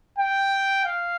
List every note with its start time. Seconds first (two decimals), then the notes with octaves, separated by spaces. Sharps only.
0.19 G5
0.85 F5